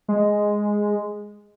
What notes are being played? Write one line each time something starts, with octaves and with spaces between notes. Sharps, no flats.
G#3